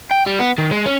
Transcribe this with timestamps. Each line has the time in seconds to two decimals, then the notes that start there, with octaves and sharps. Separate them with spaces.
0.11 G5
0.27 G3
0.39 B3
0.58 D#3
0.71 G#3
0.86 C#4